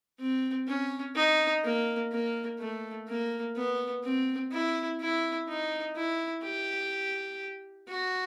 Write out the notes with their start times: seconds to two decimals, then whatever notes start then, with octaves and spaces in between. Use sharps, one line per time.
0.19 C4
0.67 C#4
1.15 D#4
1.64 A#3
2.12 A#3
2.59 A3
3.08 A#3
3.56 B3
4.03 C4
4.52 E4
5.00 E4
5.48 D#4
5.96 E4
6.44 G4
7.88 F#4